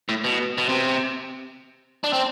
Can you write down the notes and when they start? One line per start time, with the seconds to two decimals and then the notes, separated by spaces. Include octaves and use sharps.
0.09 A2
0.24 B2
0.58 B2
0.69 C3
2.04 D4
2.13 C4